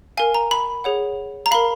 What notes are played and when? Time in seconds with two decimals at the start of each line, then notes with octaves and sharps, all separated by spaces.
0.17 A#4 F5 G#5
0.34 A#5
0.51 B5
0.84 G#4 C#5 F#5
1.46 A#5
1.51 A#4 F5 B5